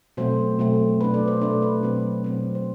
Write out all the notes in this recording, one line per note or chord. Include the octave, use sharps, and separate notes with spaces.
B2 F#3 A3 C4 C5
B2 F#3 A3 C4
B2 A3 D4 B4
D5
C5
B2 A3 D4 D5
B4
B2 F#3 C4
B2 F#3 C4
C5